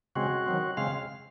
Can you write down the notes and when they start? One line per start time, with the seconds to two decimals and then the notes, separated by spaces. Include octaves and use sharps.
0.16 C#3 G#3 C4 F#4
0.46 D#3 F#3 C4
0.77 C#3 G#3 C4 F5